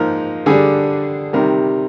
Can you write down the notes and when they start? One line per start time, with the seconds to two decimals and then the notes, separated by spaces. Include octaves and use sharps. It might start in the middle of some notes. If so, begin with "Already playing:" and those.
Already playing: G#2 F3 A#3 D#4 A#4
0.46 D3 G3 D4 G#4
1.33 C3 D#3 G3 A#4